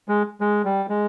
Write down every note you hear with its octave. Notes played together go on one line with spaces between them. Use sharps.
G#3
G#3
G3
G#3